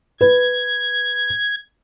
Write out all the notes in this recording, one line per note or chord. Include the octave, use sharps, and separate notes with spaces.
B4 G#6